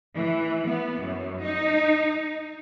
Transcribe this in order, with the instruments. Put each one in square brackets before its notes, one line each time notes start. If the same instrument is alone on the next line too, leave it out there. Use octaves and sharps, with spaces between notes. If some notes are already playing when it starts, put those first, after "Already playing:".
[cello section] E3
B3
F#2
D#4